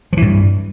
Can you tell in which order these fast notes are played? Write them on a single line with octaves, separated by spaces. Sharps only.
F3 E3 G2